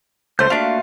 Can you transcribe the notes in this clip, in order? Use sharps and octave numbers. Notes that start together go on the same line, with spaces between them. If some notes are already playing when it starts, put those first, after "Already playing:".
C#2 A3 C5 G6
A3 A#3 D4 F4 F#4 F5